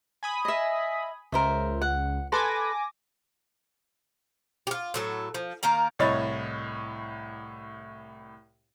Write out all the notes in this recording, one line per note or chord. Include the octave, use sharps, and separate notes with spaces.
G#5 B5 D#6
D#5 E5
C#2 A#4 C5 E5
F#5
A4 B4 G#5 C6 D6 A#6
F4 G4
A2 F#3 A4
F3
D#3 A#3 A#4 A#5
C2 A2 C#5 D#5 B5 A6